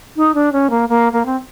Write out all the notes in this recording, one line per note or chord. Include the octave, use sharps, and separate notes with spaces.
D#4
D4
C#4
A#3
A#3
A#3
C4